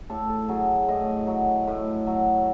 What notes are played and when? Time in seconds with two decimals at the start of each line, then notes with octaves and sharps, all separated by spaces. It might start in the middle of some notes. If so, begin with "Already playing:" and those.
0.10 A2 A4
0.29 A4
0.49 F#3 G#4
0.88 A2 D#5
1.27 F#3
1.67 A2
2.07 F#3